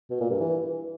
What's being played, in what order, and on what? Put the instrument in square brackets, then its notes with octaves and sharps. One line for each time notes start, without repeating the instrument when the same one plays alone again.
[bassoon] B2
A#2
G2
E3